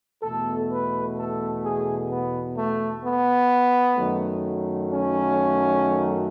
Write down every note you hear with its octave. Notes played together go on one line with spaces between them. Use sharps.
E2 B2 A3 A4
B4
A4
G#4
B3
A3
B3
F#2 D#3 F#3 A3
C#4